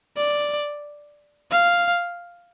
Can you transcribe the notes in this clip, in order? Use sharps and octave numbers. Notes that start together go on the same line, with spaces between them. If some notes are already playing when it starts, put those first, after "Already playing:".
D5
F5